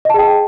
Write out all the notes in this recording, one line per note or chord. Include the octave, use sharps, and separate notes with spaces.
G#4 D#5 G5 A5